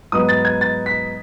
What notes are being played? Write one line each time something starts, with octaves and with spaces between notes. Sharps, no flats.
G#2 F#3 B3 D#6
A6
G#6
A6
B6